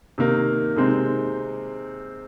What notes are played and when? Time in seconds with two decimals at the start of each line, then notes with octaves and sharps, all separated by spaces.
0.18 C3 D#3 A#3 D#4
0.76 C3 G#3 C4 D#4